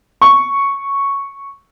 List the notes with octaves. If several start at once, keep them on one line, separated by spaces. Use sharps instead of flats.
C#6